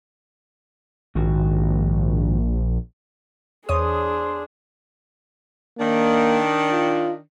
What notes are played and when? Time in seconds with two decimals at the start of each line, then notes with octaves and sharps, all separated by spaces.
1.15 A#1 G#2 D#3 F#4
3.69 E2 D4 G#4 C5 C#5 D#6
5.79 D#3 A#3 D4
6.71 F4